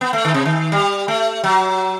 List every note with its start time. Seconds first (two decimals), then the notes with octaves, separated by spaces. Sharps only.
0.01 B3
0.13 A3
0.25 D#3
0.34 C3
0.45 D#3
0.72 G3
1.08 A3
1.44 F#3